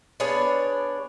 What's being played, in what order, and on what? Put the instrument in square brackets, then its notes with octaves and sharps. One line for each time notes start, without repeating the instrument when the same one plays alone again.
[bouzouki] B3 D4 G#4 C#5